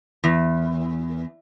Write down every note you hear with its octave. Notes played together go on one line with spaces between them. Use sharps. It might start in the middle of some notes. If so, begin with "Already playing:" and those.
E2